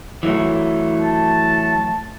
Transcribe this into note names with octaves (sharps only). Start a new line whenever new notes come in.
E3 F#3 A3
A5